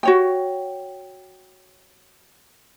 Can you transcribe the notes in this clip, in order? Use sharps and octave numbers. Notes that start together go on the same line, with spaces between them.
F#4 C#5 G5